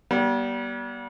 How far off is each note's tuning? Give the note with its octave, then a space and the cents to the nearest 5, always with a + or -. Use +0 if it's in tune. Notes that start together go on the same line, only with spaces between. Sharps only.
G3 -25 B3 -45